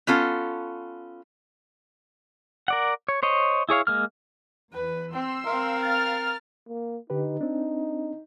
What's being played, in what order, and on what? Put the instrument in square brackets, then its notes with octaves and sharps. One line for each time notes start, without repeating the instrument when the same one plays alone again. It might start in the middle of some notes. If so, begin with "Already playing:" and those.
[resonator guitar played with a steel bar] B3 C#4 F4 A4
[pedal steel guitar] A#4 D5 F#5
C#5
C5 C#5 D#5
E4 G#4 C#5 F5
G#3 A#3 F6
[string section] E2 [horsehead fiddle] B4
[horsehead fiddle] C4 [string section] C6 E6
[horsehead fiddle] C4 F5 [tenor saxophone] A#4
[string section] F6 A6
[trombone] A#3
[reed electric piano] D3 G4 B4 [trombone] D#4
[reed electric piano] C4 D4